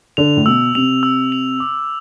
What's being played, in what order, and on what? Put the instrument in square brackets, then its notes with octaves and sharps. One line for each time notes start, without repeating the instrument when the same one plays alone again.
[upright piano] D3 [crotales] F7
[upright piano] A2
[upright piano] B2 [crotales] E6
[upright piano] C3 [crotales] F7
[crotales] E6
F7
D6